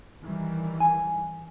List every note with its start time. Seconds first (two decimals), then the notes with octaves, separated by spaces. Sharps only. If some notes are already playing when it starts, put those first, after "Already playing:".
0.23 D#3 E3 G3
0.80 G#5